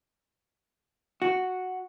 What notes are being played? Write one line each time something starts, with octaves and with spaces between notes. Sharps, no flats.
F#4